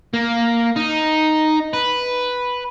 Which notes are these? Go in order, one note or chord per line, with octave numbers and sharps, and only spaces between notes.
A#3
D#4
B4